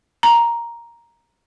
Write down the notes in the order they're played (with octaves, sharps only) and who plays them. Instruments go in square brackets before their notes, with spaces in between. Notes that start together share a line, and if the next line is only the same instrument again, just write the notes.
[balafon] A#5